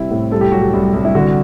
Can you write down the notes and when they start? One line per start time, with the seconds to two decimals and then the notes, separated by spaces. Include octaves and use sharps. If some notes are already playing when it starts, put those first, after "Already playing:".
Already playing: C3 G3 C4 E4
0.11 A2
0.32 C2 A4
0.41 G4
0.52 F#3 F#4
0.61 G4
0.73 C2
0.94 C2
1.05 E4
1.15 D3 F#4